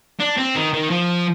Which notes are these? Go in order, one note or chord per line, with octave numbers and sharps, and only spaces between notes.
D4
C4
D#3
D#3
F3